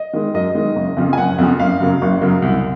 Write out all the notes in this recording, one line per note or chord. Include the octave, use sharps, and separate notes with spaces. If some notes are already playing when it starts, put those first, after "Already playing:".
Already playing: D#5
D#3 G#3
F#2 D#5
D#3 G#3
F#1
F2 C#3 F3
G#5
F#1 F#5
F2 C#3 F3
F#1 F5
F#2 C#3 F#3
F#1
F#2 C#3 F#3
C2